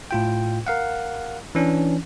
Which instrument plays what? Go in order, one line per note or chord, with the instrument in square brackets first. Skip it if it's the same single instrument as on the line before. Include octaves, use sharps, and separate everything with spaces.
[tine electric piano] A2 F4 G5
A#4 F5 F#5
E3 C#4 D4